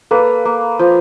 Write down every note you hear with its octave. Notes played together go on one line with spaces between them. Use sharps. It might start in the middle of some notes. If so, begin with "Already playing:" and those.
A#3 A4 B4
A#3
F3